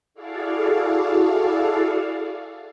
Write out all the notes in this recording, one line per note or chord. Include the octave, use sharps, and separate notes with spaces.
E4 F#4 G#4 A4 D5 F5